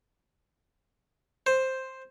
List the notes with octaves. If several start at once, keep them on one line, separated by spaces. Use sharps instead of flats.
C5